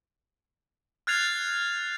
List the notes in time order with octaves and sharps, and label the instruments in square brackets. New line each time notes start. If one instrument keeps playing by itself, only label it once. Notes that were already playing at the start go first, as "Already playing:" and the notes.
[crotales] F6 F#6 G#6 A6 C7 F7